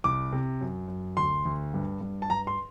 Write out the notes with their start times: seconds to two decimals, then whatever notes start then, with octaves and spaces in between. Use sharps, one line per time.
0.04 C2 D6
0.33 C3
0.61 F#2
0.88 F#2
1.17 D2 C6
1.45 D2
1.74 G2
2.01 G2
2.22 A5
2.30 G2 A#5
2.47 C6